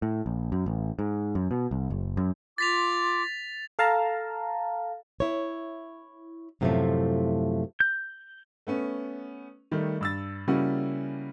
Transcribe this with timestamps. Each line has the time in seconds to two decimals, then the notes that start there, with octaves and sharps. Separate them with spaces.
0.02 A2
0.26 A#1
0.52 F#2
0.66 A1
0.99 G#2
1.35 F#2
1.51 B2
1.71 C2
1.90 F#1
2.17 F#2
2.58 F4 C6 D6 A6 B6 F7
3.79 A4 F5 A5 A#5
5.20 E4 C#5
6.61 F#2 A2 C3 D#3 F3 A3
7.80 G6
8.67 A3 B3 C#4
9.72 D#3 G3 A3
10.01 G2 E6 A6
10.47 C#3 G3 A#3 C#4 E4 F#4